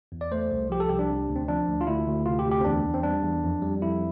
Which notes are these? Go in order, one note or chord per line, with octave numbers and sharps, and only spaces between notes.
E2
D5
A3 C5
C2
F3 G4
A4
C2 G4
D4
C3
D2
C4
F3 D4
D2
F4
D2 E4
D2
C3 F4
G4
D2
G4
C4
E2 D4
E2
C4
G3 D4
E2
F2
G3
F2 E4